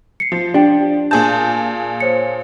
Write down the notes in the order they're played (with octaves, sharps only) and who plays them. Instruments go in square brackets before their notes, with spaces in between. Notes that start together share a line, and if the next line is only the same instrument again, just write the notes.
[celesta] C7 C#7
[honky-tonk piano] F3
[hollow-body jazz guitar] D4 [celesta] G4 G5
[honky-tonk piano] A#2 G#4 A5 [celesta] G6
[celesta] C5 C#5 C#7